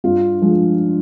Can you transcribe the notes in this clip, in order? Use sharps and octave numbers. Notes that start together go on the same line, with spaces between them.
G2 F4
F3 G#3